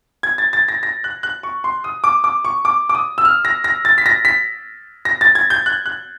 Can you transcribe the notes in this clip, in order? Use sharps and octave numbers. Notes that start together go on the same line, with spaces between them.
G#6
A6
A6
A#6
A#6
F#6
F#6
C#6
C6
D#6
D6
D6
C#6
D6
D6
D#6
E6
F6
A#6
A#6
A6
B6
A#6
B6
A#6
A6
G#6
G6
F#6
F#6